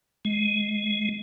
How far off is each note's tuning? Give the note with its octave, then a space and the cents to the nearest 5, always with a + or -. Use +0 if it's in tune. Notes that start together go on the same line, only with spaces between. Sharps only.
G#3 +15